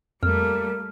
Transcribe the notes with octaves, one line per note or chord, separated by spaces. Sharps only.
F2 G3 A3 A#3 F6